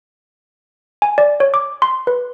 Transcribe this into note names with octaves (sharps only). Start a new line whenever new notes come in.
G#5
D5
C#5
D6
C6
B4